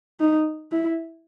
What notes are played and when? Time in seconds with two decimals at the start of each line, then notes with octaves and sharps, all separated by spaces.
0.20 D#4
0.72 E4